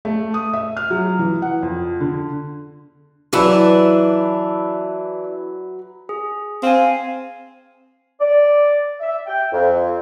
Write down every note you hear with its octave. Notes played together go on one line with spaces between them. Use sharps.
A3
D#6
E5
F6
F#3
E3
F#5
F2
D3
E3 F#3 D4 E4 B4
G#4
C4 F5 G#5
D5
E5
G5
F2